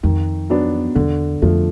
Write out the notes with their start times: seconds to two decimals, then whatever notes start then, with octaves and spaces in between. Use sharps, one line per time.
0.03 F2 D#3
0.50 F#3 B3 D4
0.95 E2 D3
1.42 F2 F3 A3